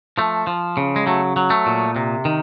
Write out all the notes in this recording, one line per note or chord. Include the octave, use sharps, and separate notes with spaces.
F3 A3
F3
C#3
G#3
F#3 A3
F#3
A3
A#2
C3
D#3